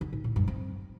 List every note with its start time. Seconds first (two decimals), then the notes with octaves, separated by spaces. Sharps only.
0.01 D3
0.13 G#2
0.24 A2
0.36 G2
0.48 C4